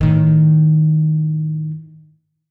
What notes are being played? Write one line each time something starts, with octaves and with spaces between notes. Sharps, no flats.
A2 D#3